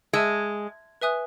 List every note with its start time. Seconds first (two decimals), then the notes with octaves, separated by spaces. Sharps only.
0.13 G#3 E5 A5 E6
1.02 B4 E5 G#5 D#6 F#6